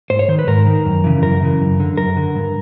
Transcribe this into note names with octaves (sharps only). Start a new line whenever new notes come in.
G#2 C5
C#5
D#3 C5
B4
G#2 A#4
D#3
F#2
C#3 E3
F#2 A#4
C#3 E3
F#2
D3
F#2 A#4
D3
G2